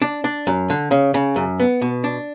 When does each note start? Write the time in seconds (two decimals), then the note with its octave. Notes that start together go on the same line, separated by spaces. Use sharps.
0.02 D4
0.24 D4
0.47 F#2
0.70 D3
0.91 C#3
1.14 C#3
1.36 F#2
1.60 B3
1.82 B2
2.04 D4